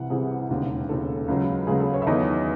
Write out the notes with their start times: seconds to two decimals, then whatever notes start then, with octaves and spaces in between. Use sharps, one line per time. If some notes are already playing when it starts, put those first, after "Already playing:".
Already playing: C2 C3 E3 F#5
0.10 C2 C3 E3 G#4
0.49 E1 D#2 C#3
0.89 E1 D#2 C#3 A4
1.28 C#2 C#3 F#3
1.67 C#2 C#3 F#3 G#4
1.80 A4
1.94 C#5
2.02 E5
2.07 E2 D#3 F#3 D#5